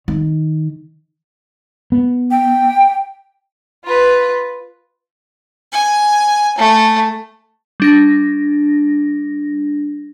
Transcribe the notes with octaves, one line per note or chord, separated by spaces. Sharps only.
D#3
B3
G5
F4 B4
G#5
A3
G3 D4 A#6